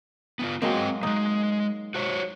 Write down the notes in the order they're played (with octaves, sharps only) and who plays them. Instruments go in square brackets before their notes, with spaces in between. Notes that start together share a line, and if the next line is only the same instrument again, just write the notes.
[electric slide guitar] B3 D#4 F4
[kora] F#3 G#3 A#3 [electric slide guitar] C4 D#5 G5
[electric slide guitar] G3 G#3 [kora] D#4
[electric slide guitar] F#4 C5 C#5